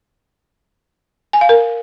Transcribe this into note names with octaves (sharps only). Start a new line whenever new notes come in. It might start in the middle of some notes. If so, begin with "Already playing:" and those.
G#5
F5
A#4